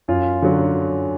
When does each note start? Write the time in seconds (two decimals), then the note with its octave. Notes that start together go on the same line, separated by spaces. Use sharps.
0.08 F#2 F4
0.42 D3 F#3